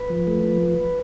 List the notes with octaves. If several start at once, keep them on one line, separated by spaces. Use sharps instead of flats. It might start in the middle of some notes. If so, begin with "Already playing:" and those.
Already playing: B4
F3
A3
F3